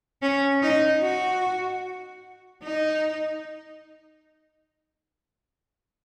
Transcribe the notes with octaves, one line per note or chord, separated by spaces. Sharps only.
C#4
D#4
F#4
D#4